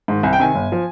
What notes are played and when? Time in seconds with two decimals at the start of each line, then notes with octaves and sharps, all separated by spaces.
0.08 G#2 D#3
0.23 C2 G#5
0.33 G5
0.39 C3 D#3 G#5
0.55 G1
0.72 F3